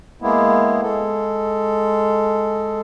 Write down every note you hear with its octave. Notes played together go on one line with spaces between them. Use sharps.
G#3 A#3 B3 E4
G#3 A4